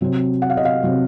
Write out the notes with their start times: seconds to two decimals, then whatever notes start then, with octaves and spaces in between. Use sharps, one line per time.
0.01 C3 F#3 C4
0.42 F#5
0.50 F5
0.57 D#5
0.65 F5
0.83 C3 F#3 C4